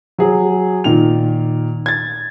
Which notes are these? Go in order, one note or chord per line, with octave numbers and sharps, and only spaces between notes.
F#3 G#4
A#2 D#3 F7
G#6 A6